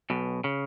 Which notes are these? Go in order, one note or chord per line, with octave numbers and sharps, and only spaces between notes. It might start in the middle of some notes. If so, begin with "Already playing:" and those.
B1 B2
C#3